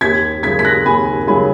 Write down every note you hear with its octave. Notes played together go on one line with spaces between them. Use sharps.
D#2 G#6 B6
C#3 F#3 G#6 B6
B6
F#6 A#6
D#2 G#5 B5
C#3 F#3 G#5 B5